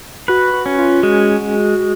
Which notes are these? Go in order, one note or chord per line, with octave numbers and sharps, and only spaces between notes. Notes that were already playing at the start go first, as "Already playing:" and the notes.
F#4 B4
F#4
C#4
F4
G#3 F#4